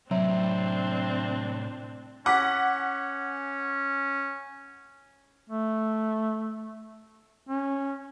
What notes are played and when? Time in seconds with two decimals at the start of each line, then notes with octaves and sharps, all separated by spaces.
0.11 A2 C3 F#3 C4 D4 E5
2.26 C#4 F#5 D6 B6
5.50 A3
7.49 C#4